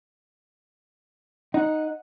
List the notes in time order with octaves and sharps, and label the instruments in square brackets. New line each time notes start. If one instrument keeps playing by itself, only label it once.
[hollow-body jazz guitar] D#4 [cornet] F#5